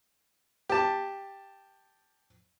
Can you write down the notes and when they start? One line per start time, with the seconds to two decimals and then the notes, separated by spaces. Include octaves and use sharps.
0.69 G4 A5